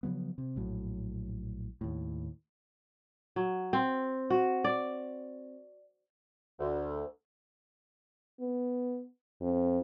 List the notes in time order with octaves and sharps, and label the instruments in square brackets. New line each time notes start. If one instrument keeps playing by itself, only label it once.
[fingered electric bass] C#3 F3 F#3 B3
C3
A#1 A2 F#3
D#2 A2
[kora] F#3
C4
F#4
D5
[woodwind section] D2
[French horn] B3
F2